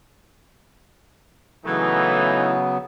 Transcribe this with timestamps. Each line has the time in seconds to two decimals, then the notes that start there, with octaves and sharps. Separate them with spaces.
1.65 C#3 E3 F#3 A3 B3 D#4